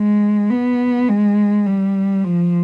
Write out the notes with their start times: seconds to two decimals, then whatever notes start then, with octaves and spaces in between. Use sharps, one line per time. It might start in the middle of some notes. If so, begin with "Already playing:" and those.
Already playing: G#3
0.50 B3
1.09 G#3
1.67 G3
2.24 F3